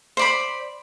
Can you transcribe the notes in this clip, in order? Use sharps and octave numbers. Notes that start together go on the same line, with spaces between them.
C5 D5 B5